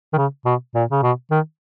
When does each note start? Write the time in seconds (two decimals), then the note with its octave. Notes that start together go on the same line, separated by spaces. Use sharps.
0.13 D#3
0.17 C#3
0.46 B2
0.75 A#2
0.91 C#3
1.03 B2
1.31 D#3